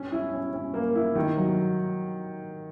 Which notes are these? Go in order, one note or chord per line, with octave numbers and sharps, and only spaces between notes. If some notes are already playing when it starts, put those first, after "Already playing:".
Already playing: C#4
E4
C#4
C#4
A#3
E4
D#3
F#3